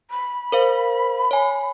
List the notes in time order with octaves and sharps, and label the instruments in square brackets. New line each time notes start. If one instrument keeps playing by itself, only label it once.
[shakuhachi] B5
[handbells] A#4 C5 F5
C#5 G#5